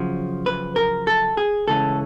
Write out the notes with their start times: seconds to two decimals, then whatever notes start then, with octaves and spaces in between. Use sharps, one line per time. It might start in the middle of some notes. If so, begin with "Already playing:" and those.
Already playing: F#2 C#3 F3
0.46 B4
0.76 A#4
1.07 A4
1.37 G#4
1.67 C#2 C#3 E3 A3 C#4 A4